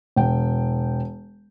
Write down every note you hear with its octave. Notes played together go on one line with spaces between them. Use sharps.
E1 G5